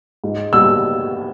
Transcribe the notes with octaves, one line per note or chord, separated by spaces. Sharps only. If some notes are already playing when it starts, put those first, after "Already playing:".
G#2
G3 E6